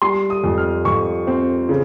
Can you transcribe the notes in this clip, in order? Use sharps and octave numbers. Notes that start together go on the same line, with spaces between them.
G3 C6
D#6
F2
F6
F2 C#6
C4
C#3